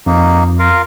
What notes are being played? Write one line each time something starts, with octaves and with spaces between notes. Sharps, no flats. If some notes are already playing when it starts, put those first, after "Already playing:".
F2 A#3 D#4
F4 A#4 F5